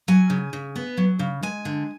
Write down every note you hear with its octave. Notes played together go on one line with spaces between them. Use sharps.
F#3 G#5
C#3
C#3
B3
F#3
C#3
G#3 G#5
D3